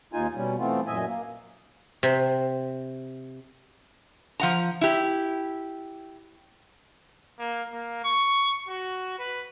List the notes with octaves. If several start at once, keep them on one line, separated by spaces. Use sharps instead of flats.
D#2 D#4 F4 G#5
B2 G3 C#4
E3 A3 B3 C4 F4
F#2 A#2 D#5 E5 G#5
A#3
C3
F3 F#5 A#5
E4 G4
A#3
A#3
C#6
F#4
B4